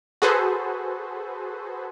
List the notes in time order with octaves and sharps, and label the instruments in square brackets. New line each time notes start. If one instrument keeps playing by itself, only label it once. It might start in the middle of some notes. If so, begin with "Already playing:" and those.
[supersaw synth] F#4 G#4 A4 B4 C5